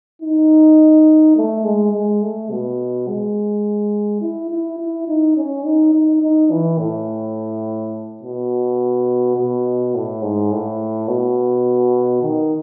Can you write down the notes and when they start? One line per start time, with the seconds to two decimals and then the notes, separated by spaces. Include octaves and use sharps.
0.22 D#4
1.36 A3
1.64 G#3
1.93 G#3
2.22 A3
2.51 B2
3.08 G#3
4.21 E4
4.50 E4
4.79 E4
5.08 D#4
5.37 C#4
5.65 D#4
5.94 D#4
6.22 D#4
6.51 E3
6.79 A2
8.23 B2
9.37 B2
9.94 A2
10.22 G#2
10.51 A2
11.08 B2
12.22 D#3